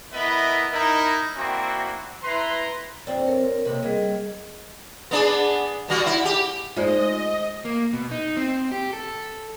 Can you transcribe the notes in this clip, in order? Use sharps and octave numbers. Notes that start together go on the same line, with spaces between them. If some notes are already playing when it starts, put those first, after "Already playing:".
B3 E4 A#4 B4 D#5 E5
D#4 E4 A#4
A#3 C4 D4 E4 F#4
E4 B4 A#5 C6
F2 C4 D4
A#4 C#5
D#2 C3 B4
G3 A#3 G#4 D#5
B3 D4 G#4
B2 G3 F#4
E4
G4
G#3 D#4 F4 C5 D5 D#5
A#3
B2
D#4
C4
G4
A4